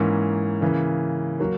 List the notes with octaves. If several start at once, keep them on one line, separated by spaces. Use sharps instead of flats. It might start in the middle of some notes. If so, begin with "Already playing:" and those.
Already playing: G#2 E3 A#3 C#4
C#3 E3 A#3
F#3 A#3